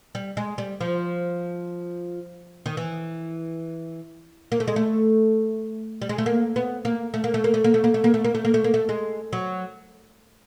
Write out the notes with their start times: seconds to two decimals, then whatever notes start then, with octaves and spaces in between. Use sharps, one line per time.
0.15 G3
0.37 G#3
0.58 G3
0.81 F3
2.66 D#3
2.77 E3
4.52 A#3
4.60 A3
4.68 G#3
4.76 A3
6.02 G3
6.09 G#3
6.18 A3
6.26 A#3
6.56 B3
6.85 A#3
7.14 A3
7.24 A#3
7.34 A3
7.44 A#3
7.54 A3
7.64 A#3
7.74 A3
7.84 A#3
7.94 A3
8.04 A#3
8.14 A3
8.24 A#3
8.35 A3
8.45 A#3
8.54 A3
8.64 A#3
8.74 A3
8.89 G#3
9.33 F#3